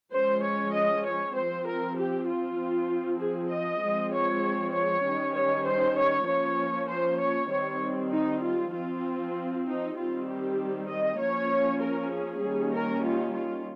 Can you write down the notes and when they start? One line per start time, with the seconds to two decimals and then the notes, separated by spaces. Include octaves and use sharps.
0.13 F3 G#3 C#4 C5
0.43 C#5
0.74 D#5
1.05 C#5
1.36 F3 C4 C5
1.66 A#4
1.97 G4
2.28 F4
2.59 F3 C4
3.20 G#4
3.51 D#5
3.82 F3 G#3 C4
4.13 C#5
4.74 C#5
5.05 D#3 G3 C#4
5.35 C#5
5.66 C5
5.97 C#5
6.27 F3 A#3 C#4 C#5
6.89 C5
7.20 C#5
7.51 D#3 G3 C4 C#5
8.12 D#4
8.43 F4
8.73 F3 C4 F4
9.66 D#4
9.96 D#3 G3 C4 F4
10.28 G4
10.89 D#5
11.20 F3 A#3 C#4 C#5
11.81 A#4
12.12 G#4
12.42 D#3 G3 A#3 C#4
12.73 A#4
13.04 F4
13.35 F4